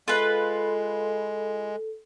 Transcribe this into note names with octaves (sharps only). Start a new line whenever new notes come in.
G#3 F4 A4 B4